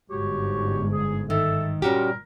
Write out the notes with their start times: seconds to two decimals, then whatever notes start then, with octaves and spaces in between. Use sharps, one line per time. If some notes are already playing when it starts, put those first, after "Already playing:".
0.10 G1 G#2 F#4 G4 C#5
0.92 G#4
1.30 D#3 A4 E5
1.82 A#2 G3 C#4 F#4 G4 A#4